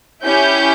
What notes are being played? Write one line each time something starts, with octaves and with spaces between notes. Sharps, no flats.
C#4 E4 G4 G6